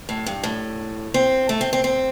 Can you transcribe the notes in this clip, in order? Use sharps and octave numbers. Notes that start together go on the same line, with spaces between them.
A2
G2
A2
C4
A3
C4
C4
C4